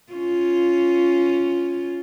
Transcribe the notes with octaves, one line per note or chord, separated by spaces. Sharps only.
C#4 F4